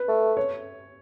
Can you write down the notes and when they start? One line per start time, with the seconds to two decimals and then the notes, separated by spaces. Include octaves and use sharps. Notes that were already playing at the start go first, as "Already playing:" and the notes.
Already playing: B4
0.08 A3
0.37 C#5